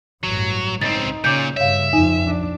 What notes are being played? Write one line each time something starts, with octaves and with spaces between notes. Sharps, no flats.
A1 G2 F#3
C#2 C4 D#4 A6
A#2 C#3 C#4 D6 G6
G2 C#3 C#5 E5 F5
F2 D#4 G#5
D4